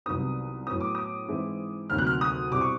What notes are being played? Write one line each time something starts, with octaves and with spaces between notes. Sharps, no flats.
C2 C3 D#3 F#3 B3 D#6
A2 F#3 B3 D#6
D6
D#6
G#2 E3 G#3 C4 E4
D2 C3 D#3 F#3 A#3 F6
F#6
F6
D#6
B2 G3 C4 E4 D6
C#6